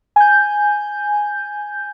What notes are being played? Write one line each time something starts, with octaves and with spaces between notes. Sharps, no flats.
G#5 G6